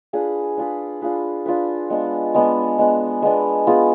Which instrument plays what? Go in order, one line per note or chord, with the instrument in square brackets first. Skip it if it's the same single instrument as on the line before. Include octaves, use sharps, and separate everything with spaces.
[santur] D4 F4 G#4 B4
D4 F4 G#4 B4
D4 F4 G#4 B4
D4 F4 G#4 B4
G#3 B3 D4
G#3 B3 D4
G#3 B3 D4
G#3 B3 D4
B3 F4 G#4